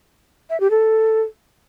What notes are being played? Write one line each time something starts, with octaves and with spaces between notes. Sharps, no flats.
E5
G4
A4